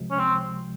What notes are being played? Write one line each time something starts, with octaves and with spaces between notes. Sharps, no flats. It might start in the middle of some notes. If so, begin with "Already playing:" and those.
Already playing: C#2 C3 F3 G#3
C#4
C4